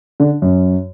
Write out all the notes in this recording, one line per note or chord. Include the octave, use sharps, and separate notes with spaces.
D3
F#2